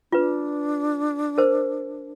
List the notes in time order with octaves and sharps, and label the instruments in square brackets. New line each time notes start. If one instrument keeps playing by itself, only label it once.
[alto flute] D4 [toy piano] F4 B4
[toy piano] A#4 C5